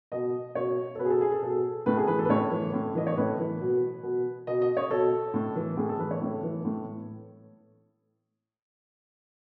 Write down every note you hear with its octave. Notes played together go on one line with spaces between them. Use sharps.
B2 D#5
B2 C#5
A4
B2 B4
G#4
A4
G#4
A4
B2 A4
A2 B4
G#4
E3 B4
A4
B4
A2 C#5
E3
A2
E3 D#5
C#5
A2 B4
E3
B2
B2
B2 D#5
D#5
C#5
B2 A4
A2
E3
A2 G#4
A4
E3 B4
C#5
A2
E3
A2